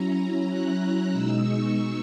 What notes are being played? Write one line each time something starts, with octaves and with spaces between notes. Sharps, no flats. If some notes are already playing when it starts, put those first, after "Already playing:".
Already playing: F#3 C#4 E4 A#5
F#6
B2 G#3 D#4 E6
C#6